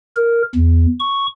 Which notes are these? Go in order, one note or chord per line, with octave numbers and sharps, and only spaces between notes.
A#4
E2
C#6